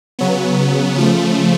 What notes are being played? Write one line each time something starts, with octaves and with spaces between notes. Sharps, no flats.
C#3 F#3 B3
C#3 F3 A3